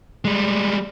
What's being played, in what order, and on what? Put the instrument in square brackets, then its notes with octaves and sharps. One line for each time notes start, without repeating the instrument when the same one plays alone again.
[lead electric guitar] G3 G#3